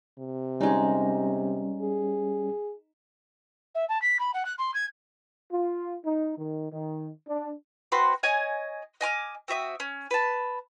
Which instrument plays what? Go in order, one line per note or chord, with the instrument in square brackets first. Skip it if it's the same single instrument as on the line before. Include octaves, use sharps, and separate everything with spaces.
[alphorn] C3
[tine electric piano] G3 C#4 [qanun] G#3 D#4
[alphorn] G#4
[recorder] E5
A5
B6
B5
F#5
F#6
C6
G#6
[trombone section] F4
D#4
D#3
D#3
D4
[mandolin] C4 F#4 B4 C6
C#5 D#5 G#5
D#5 G#5 D6 F6
C4 F#4 E5 D#6
C#4
B4 A5